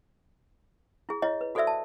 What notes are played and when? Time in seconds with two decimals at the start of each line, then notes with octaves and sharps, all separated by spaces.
1.09 E4 G#4
1.22 E4 C#5 D#5
1.41 B4
1.55 F#4 A4 C5 D5 E5 E6
1.67 A5